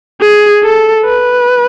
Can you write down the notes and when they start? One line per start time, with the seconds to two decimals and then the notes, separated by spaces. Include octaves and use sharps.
0.21 G#4
0.63 A4
1.05 B4